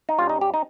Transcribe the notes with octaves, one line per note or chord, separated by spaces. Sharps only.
D#4
G2 G3 C#4 F4
D#4
G4
D#4